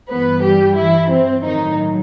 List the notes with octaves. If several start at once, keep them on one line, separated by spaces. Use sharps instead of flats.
G2 E3 B3 B4
G3 G4
E3 E4
C4
A2 D#3 F#3 D#4